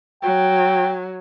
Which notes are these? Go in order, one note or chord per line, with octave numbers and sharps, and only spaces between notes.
F#3 G5